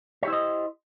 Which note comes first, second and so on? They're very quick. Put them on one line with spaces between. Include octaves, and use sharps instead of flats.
C#5 G4 E4 C5 D#5